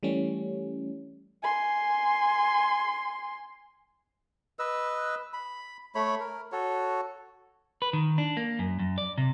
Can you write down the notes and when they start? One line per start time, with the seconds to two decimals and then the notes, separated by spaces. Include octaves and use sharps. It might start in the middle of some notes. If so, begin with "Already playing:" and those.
0.03 E3 G3 A3 C#4
1.43 G#5 C6
4.59 B4 D#5 E6
5.33 B5
5.95 A3 C#5 B5
6.20 A#4
6.52 F#4 A4 C#5
7.82 B4
7.93 D#3
8.18 D4
8.37 A#3
8.59 F#2
8.79 F#2
8.98 D5
9.18 C3